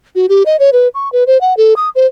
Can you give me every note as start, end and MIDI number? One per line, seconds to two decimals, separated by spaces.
0.15 0.26 66
0.29 0.43 67
0.46 0.57 75
0.59 0.70 73
0.73 0.88 71
0.94 1.11 85
1.12 1.24 71
1.27 1.40 72
1.41 1.56 78
1.57 1.74 69
1.76 1.89 87
1.95 2.06 72